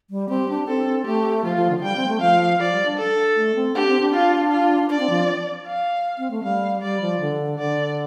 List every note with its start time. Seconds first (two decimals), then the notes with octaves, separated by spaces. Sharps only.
0.10 G3
0.29 C4 G4
0.49 D4
0.68 C4 A4
1.06 A3 G4
1.44 F3 F4
1.57 F3
1.70 D3
1.77 F3
1.83 G3 G5
1.96 C4
2.08 A3
2.21 F3 F5
2.59 F3 D5
2.72 G3
2.85 D4
2.98 A4
3.36 A3
3.55 C4
3.75 D4 G4
3.88 C4
4.01 D4
4.14 F4
4.51 F4
4.90 D4 D5
5.00 C4
5.10 F3
5.67 F5
6.18 C4
6.31 A3
6.43 G3 F5
6.82 G3 D5
7.01 F3
7.20 D3
7.59 D3 D5